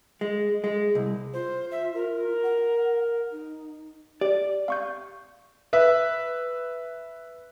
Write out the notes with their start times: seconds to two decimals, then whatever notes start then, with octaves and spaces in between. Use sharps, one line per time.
0.21 G#3
0.64 G#3
0.95 C2
1.33 F4 C5
1.72 E5
1.94 A#4
2.43 F#5
3.32 D#4
4.21 G4 D5
4.68 F5 C#6 G6
5.73 B4 E5